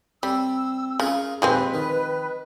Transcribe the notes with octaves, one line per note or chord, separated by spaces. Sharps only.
G3 C4 E6
C#3 F4 G#4 A#4
D#2 A#2 F3 G#3 C4 B4
D#3